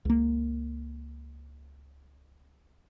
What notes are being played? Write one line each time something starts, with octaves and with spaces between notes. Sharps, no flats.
C#2 A#3